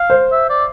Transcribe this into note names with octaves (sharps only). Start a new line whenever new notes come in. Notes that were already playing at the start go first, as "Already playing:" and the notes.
Already playing: F5
C5
E5
D5